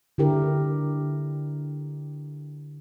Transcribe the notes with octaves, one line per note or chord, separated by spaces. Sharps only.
D3 E4 G4 A#4